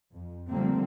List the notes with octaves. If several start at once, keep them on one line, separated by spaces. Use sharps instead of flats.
F2
D3 F3 G3 A3 A#3 C4